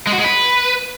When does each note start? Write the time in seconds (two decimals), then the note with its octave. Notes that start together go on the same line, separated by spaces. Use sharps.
0.07 G#3
0.13 F#4
0.19 G#3
0.24 B4